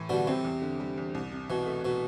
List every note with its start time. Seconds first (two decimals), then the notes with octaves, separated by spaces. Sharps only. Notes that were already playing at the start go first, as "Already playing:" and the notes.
Already playing: A2 E3
0.09 B2 D3 G3
0.27 C3 C4
0.44 E2
0.62 D3
0.80 G3
0.98 E2
1.14 C2
1.32 C3
1.49 B2 E3
1.67 A3
1.85 B2